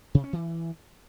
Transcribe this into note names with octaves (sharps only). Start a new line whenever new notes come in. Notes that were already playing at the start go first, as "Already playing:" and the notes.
C3
C#4
E3